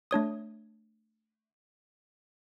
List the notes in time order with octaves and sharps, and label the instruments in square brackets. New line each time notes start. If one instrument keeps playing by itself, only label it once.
[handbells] A3 D4 C#5 D#6